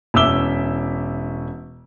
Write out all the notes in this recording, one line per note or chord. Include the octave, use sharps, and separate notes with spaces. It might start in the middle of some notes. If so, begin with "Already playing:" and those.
E1 C#4 E5 D6 E6 G7